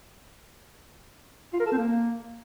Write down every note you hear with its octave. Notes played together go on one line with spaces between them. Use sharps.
F4
A#4
A4
C4
A#3